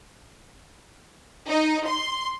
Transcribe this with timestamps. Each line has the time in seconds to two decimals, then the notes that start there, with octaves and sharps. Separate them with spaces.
1.48 D#4
1.87 C6